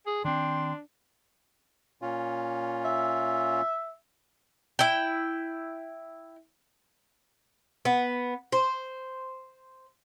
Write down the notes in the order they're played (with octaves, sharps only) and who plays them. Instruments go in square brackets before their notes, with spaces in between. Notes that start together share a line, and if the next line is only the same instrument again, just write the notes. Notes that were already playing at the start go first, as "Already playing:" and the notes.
[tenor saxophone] G#4
[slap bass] D#3 C4 [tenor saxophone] D4 [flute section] G5 C6
[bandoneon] A#2 C#4 F4
[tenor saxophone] E5
[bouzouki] E4 G5
B3
C5